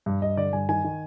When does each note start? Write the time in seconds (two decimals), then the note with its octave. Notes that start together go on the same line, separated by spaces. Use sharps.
0.06 G2
0.22 G2 D#5
0.37 D3 D5
0.53 G2 G#5
0.69 D#3 G#5
0.84 D#3